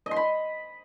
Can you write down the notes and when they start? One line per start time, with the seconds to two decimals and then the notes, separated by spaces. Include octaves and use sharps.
0.06 D#5
0.11 C6
0.16 B5